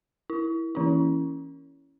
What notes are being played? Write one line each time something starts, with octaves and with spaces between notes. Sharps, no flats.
E4
E3 C#4 E4